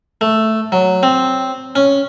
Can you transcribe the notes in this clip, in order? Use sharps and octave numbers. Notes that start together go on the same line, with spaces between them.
A3
F#3
C4
C#4